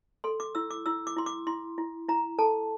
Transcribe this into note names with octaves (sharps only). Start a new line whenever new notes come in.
A4 C6
D6
E4 E6
D6
E4 E6
D6
E4 C6
D6
E4 C6
E4
E4 A#5
A4 A5